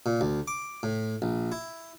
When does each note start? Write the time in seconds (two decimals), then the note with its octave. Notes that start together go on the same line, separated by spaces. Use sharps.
0.06 A#2
0.21 D2
0.48 D6
0.83 A2
1.22 A#1
1.52 E4